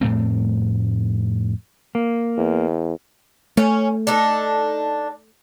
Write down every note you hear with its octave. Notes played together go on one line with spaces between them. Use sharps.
F2 A2 A3 C4
A#3
E2
A3 C#4
D4 D#4 A4